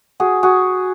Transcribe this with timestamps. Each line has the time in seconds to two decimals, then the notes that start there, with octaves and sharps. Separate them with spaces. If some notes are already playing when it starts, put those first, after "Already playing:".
0.20 F#4 G#4
0.43 F#4 G#4